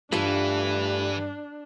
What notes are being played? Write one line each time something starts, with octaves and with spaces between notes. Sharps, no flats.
G2 E3 A3 D4 F4 A4